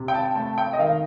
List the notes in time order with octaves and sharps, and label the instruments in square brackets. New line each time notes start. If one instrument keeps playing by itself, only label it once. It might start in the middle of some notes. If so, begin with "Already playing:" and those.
Already playing: [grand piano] C3
G5
A5
A3 A5
G5
D#5
D#3 F5